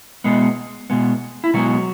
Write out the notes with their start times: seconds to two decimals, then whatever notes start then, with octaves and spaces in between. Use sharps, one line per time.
0.24 B2 G#3 B3
0.90 B2 G#3 B3
1.44 E4
1.54 B2 F#3 G#3 B3 F#4